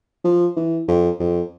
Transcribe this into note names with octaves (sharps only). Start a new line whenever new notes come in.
F3
E3
F2
F2